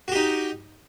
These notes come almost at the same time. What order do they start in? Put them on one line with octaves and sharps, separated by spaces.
F#4 G4 D#4